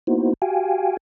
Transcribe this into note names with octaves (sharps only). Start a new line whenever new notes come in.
A#3 B3 D#4 E4 F#4 C5
F#4 G4 F5 G5 G#5